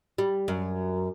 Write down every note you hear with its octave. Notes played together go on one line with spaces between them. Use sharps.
G3
F#2